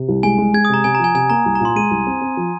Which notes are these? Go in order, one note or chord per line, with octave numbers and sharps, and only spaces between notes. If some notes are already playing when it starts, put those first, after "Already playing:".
Already playing: C3
C2
G#3 G#5
G#3
G#3 G#6
D#6
C3 A#5
C3 G#5
A#5
F3 G#5
C3 G#5
A#3 A#5
C2
A#5
A#2 C6
G#3 D#7
C2
C4
C4
F3